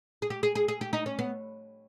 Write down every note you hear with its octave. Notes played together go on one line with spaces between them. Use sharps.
G#4
G4
G#4
G#4
G#4
G4
D#4
C#4
B3